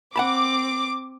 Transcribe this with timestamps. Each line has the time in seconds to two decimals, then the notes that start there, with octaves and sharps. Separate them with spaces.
0.16 C4 F#5 A5 B5 D6